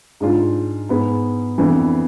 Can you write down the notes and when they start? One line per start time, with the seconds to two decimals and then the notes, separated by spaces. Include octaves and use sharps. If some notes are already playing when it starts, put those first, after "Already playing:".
0.21 G#2 G#3 D4 F4
0.89 G#2 G#3 B3
1.58 F2 E3 B3 D4